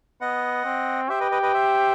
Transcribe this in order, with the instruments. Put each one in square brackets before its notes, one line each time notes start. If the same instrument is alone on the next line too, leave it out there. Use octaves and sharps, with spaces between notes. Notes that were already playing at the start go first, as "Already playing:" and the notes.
[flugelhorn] B3 [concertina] D#5 F#5
[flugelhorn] C4
[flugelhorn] G4 [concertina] C5 E5
[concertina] B4 D#5
B4 D#5
B4 D#5
C5 E5